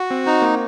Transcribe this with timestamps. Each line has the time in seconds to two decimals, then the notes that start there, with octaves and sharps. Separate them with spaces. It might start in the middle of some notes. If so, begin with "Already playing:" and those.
Already playing: F#4
0.10 C4
0.26 C4 D#4
0.42 A#3